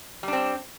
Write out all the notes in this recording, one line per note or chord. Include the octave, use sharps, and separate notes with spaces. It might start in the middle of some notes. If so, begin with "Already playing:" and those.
G3 C4 D4